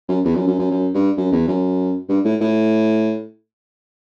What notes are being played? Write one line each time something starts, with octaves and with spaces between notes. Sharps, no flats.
F#2
E2
F#2
F#2
F#2
F#2
G2
F#2
E2
F#2
G2
A2
A2